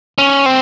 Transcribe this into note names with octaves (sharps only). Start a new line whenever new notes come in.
C#4
C4